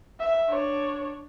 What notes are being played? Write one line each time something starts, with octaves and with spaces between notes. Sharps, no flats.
E5
D4 C#5